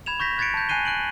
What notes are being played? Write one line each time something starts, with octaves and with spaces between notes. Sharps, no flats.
B5 G#6 E7 F7
C#6 G6 A#6 B6
F#6 G#6 A6 B6 C#7 D7
A5 G6
G#5 F#6 C7 D#7 G7
F#6 D7 F#7